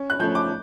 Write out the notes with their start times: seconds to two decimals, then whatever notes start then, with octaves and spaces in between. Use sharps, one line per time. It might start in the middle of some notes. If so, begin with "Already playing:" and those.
Already playing: C#4
0.10 F#6
0.20 F3 A3 C#4 G6
0.35 D6